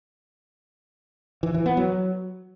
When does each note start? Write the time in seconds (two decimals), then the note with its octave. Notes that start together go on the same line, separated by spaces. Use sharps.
1.43 E3
1.54 E3
1.66 B3
1.77 F#3